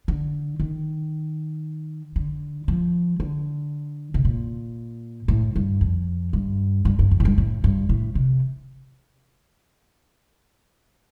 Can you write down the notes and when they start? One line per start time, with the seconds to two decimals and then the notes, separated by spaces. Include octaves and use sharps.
0.08 D3
0.60 D#3
2.16 D3
2.68 F3
3.20 D3
4.14 C3
4.25 A#2
5.28 A2
5.56 G2
5.81 F2
6.33 G2
6.85 G2
6.99 G2
7.11 F2
7.20 A2
7.25 G2
7.38 A2
7.64 G2
7.89 A2
8.15 C3